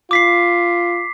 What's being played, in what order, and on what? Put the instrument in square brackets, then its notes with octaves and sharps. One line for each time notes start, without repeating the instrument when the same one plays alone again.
[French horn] F4 [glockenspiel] D6 B6 C7